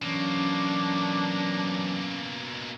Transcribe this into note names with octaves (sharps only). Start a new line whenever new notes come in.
B2 E3 F#3 A#3 C#4 D4